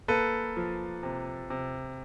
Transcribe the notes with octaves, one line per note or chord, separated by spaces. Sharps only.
A#3 A4 B4
F3
C3
C3